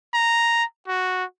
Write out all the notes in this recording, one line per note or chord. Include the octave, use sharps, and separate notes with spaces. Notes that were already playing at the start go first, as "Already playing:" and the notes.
A#5
F#4